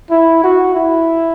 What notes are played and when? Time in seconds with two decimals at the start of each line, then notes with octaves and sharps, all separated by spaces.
0.10 E4
0.44 F#4
0.75 E4